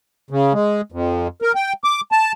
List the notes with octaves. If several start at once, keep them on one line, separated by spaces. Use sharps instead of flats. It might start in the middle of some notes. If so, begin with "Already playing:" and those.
C#3
G#3
F2
A#4
G5
D6
A5